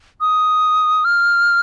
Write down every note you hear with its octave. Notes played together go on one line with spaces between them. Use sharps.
D#6
F6